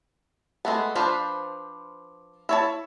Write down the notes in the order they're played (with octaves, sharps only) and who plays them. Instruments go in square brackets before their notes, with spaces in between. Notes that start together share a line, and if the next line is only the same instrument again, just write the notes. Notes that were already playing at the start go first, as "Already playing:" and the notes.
[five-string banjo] G#3 A3 B3
F3 D4 B4 C5
E4 C#5 A5